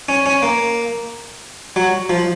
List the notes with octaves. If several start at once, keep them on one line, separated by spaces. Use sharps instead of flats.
C#4
C#4
A#3
F#3
F3